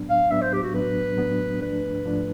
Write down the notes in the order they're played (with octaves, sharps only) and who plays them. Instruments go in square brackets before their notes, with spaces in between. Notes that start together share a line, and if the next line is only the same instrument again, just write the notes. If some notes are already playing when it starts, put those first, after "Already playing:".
Already playing: [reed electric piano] A2 F#3 B3 D4
[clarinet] F5
[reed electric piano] A2 F#3 B3 D4 [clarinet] E5
[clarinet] C5
G4
F#4
[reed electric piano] A2 F#3 B3 D4 [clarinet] B4
[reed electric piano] A2 F#3 B3 D4
[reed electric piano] G#2 F3 A3 D4 [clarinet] B4
[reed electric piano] G#2 F3 A3 D4